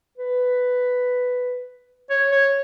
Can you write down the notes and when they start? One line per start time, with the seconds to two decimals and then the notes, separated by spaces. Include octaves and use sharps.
0.18 B4
2.10 C#5
2.31 C#5